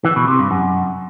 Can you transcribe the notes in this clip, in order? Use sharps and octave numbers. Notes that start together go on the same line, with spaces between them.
E3
B2
C3
G2
F#2